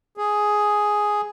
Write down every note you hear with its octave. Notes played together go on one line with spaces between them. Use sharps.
G#4